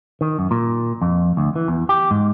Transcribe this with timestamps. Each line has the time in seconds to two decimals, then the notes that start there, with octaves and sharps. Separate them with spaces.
0.21 D#3
0.39 F#2
0.51 A#2
1.02 F2
1.37 D2
1.56 E3
1.68 E2
1.89 G4
2.11 G#2